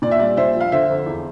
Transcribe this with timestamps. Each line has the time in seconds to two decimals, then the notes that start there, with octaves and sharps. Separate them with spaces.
0.02 A#2 D5
0.11 E5
0.19 G3 D5
0.37 A#2 C5 E5
0.55 F3
0.61 F5
0.72 D3 C5 E5
0.89 F2
1.06 E2